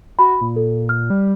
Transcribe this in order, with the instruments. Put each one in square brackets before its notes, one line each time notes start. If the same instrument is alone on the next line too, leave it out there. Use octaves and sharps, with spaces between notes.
[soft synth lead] F#4 [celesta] B5
[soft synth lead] A#2
[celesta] A4
F6
[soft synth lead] G3